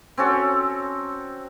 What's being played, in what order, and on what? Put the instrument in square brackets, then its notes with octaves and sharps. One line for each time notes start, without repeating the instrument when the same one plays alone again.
[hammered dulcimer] C4 C#4 F#4 A4